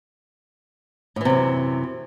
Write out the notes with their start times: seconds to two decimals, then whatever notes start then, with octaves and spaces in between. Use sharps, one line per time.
1.16 A2
1.21 E3
1.25 C3
1.30 F#2